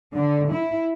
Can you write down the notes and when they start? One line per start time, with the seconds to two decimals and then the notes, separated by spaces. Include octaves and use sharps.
0.16 D3
0.51 E4